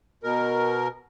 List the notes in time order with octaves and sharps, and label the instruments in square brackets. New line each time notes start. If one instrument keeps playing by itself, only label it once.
[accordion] B2 A#4